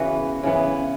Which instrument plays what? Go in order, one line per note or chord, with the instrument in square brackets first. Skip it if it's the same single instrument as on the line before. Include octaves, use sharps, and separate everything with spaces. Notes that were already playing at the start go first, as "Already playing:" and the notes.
Already playing: [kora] C#3 E3 B3 F#4 B4
C#3 E3 B3